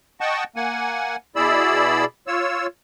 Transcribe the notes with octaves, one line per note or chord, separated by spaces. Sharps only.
D#5 F#5 G5 A5 C#6
A#3 F#5 G#5
B2 E4 G#4 D5 B5 E6
F4 C#5 E6